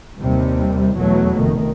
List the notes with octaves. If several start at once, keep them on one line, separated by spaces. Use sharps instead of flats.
D#2 C3 G3
E2 B2 F#3 A3
F1 D#3